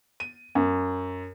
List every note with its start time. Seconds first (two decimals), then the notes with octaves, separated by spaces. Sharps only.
0.20 D#7
0.55 F#2